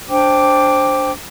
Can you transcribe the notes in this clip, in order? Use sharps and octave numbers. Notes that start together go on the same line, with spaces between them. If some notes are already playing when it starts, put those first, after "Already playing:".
D4 C5 G5 D6